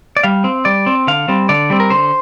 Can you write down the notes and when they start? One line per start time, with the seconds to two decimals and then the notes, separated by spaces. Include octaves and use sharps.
0.17 D5
0.23 G3 F5
0.44 C4
0.65 G3 D5
0.86 C4
1.07 D3 F5
1.28 G3 C4
1.49 D3 D5
1.70 G3 C4
1.80 A#4
1.90 D3 C5